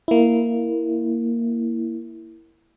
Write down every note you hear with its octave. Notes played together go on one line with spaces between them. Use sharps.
A#3 E4